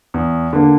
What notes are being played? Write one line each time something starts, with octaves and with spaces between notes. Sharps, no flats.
E2
D3 A#3